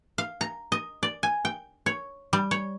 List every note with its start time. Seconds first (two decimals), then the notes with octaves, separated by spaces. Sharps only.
0.18 F5
0.41 A#5
0.72 D#5
1.03 D5
1.23 G#5
1.45 G5
1.86 C#5
2.33 G3
2.51 C#5